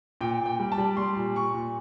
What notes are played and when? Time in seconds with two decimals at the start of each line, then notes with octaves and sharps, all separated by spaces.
0.21 A#2 G5
0.40 A#2
0.46 G5
0.59 G3
0.72 A5
0.78 G3
0.97 G3 C6
1.17 A#2
1.36 A#2 C#6
1.54 A#2